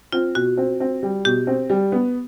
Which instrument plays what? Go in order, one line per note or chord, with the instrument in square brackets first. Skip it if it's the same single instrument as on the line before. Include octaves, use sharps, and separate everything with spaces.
[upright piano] C4 [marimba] F4
[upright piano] B2 [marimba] F#4
[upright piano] C4
C4
G3
[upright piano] B2 [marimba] G4
[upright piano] C4
G3
B3